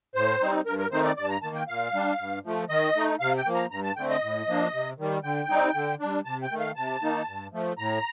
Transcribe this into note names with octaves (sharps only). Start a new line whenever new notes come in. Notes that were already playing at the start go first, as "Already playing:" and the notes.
A2 C5
G3 C4 D#4
G2 A#4
A#4
D#3 A3 C4 D#4 C5
D5
G2 D5
A5
A#5
D#3 A#3 A5
G5
A#2 F5
G3 D4
G2
F3 A3
D#3 D#5
A3 D#4
C3 F5
G5
F3 A#3
A#5
G2 A#5
A5
D3 A3 C4 G5
D#5
A2
F3 A#3 D4
C3
D#3 G3
D3 G5
G3 C4 D#4
D3
G3 D4
C3 A5
G5
D#3 A3
F5
C3 A5
D#3 A#3 D#4
G2
F3 A3
A2 A#5